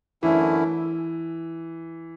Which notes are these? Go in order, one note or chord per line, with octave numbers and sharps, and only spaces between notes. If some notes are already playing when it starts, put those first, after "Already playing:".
F#2 D3 E3 A3 C#4 E4